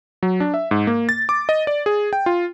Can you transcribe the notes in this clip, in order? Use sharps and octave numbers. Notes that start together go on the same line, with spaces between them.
F#3
D4
E5
G#2
A#3
A6
D6
D#5
D5
G#4
G5
F4